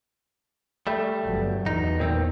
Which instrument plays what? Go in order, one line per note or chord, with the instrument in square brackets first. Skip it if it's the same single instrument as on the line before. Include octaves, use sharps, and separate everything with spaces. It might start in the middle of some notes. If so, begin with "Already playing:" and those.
[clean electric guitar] G3 A3
[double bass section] G1 F#3
[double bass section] E2 [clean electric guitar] D#4
[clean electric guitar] A#2 D#3 C4